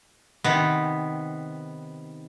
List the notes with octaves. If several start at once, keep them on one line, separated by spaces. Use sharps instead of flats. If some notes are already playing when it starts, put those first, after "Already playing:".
C3 D#3 B3